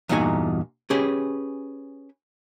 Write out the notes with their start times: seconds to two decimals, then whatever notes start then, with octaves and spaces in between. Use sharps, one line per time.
0.09 E2 G2 A#2 D#4 F#4 G#5
0.90 C#4 G4 G#4 B4